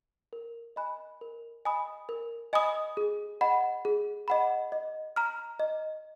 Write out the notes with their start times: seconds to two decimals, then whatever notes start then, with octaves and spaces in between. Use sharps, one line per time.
0.33 A#4
0.76 D#5 G#5 B5 F#6
1.21 A#4
1.65 D#5 G#5 B5 D#6
2.09 A#4
2.53 D#5 G#5 B5 D#6
2.97 G#4
3.41 D#5 F#5 B5
3.85 G#4
4.28 D#5 F#5 B5
4.72 D#5
5.16 A#5 F6
5.60 D#5